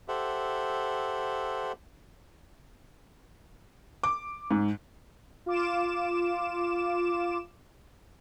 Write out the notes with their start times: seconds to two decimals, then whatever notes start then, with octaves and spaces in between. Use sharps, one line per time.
0.08 G4 A4 C5 E5 F#5
4.03 D6
4.51 G#2
5.46 F4 D6 E7